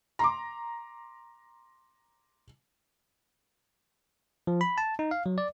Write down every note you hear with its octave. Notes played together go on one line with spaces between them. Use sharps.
A#5 C6 D6
F3
B5
A5
D#4
F5
F#3
D5